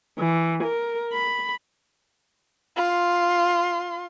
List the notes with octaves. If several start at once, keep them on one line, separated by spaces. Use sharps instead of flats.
E3
A#4
B5
F4 C6